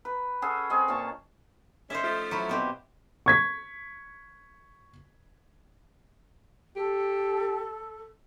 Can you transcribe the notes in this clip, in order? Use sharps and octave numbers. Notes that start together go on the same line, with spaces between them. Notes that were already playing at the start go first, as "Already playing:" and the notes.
B4
C#4 G#4 A4 F#5
C4 G#4 D#5
A#2 C#4 A5 C#6
C#4 C5 D#5 E5
F3 A3 C#4
F#3 E4
B2 C4 G4
C#6 G#6 B6
G4 A4